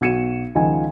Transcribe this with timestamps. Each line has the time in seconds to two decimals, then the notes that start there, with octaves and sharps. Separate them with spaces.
0.01 B1 F#4 G#6 C#7 D#7 E7
0.55 C#2 D#3 F3 F#5 G#5